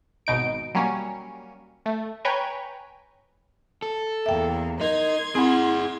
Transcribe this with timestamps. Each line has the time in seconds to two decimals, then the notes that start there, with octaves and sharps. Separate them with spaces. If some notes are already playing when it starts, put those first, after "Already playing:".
0.27 G#1 B2 D#4 D7
0.75 F#3 G3 A#3 C#4
1.86 A3
2.25 B4 C#5 G5 G#5 A#5
3.82 A4
4.26 E2 A#3 E5 G5
4.81 D#4 A#4 C6 G#6
5.35 C4 E4 G#4 F#5 G#5 B5